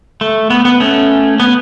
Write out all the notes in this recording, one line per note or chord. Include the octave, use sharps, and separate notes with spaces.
A3
B3
B3
A3 C#4
B3